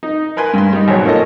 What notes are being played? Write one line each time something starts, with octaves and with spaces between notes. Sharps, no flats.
D#4
A#4 B4 G#5 C6
G2 C6
G3 D#4
G#1 B2 F#3 C5 C#5
A#3 C#4 F4 A4 D#5